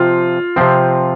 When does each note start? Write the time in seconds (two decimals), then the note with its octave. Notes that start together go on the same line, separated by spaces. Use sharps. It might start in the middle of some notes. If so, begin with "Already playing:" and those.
Already playing: C3 F3 C4 F4
0.56 C3 F3 C4